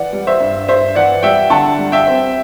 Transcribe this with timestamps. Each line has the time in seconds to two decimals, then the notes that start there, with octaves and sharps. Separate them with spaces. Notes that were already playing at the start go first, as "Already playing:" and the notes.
Already playing: E3 D5 F#5
0.13 G3
0.27 C5 E5
0.40 G2
0.68 G2 C5 E5
0.95 E3 D5 F#5
1.23 G3 E5 G5
1.50 D3 F#5 A5
1.79 G3
1.92 E5 G5
2.07 C4